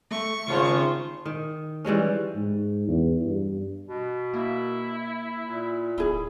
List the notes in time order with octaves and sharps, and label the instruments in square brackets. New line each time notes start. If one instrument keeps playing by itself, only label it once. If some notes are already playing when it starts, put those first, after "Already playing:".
[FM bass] A3 [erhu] C#6
[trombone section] G#1 [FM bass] C#3 [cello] F4 C5
[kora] D#3
E3 G3 G#3 C#4
[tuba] G#2
E2
G2
[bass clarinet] B2
[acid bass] A#3 [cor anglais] E4
[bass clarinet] A#2
[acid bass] D1 [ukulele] E4 G#4